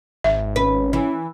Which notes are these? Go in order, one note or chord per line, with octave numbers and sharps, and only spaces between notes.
G#1 E5
C#4 B4
E3